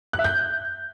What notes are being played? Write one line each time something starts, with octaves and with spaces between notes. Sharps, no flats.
F#6
E5
G6